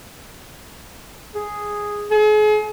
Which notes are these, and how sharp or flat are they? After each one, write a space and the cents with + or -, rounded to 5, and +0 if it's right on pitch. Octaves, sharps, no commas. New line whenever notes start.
G#4 -5
G#4 +40